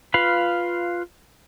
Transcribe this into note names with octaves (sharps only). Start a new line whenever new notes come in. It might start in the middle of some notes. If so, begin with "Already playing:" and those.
F4 B4 F5 B5